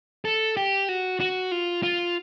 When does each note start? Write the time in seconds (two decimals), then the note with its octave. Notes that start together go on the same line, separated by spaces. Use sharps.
0.25 A4
0.57 G4
0.89 F#4
1.20 F#4
1.51 F4
1.83 F4